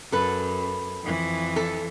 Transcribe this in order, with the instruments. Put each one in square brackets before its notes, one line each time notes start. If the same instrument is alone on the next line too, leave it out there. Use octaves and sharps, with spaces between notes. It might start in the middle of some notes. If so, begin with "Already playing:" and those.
[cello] F#2 [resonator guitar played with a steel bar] A4 B4
[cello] F2 E3
[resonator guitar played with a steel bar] A4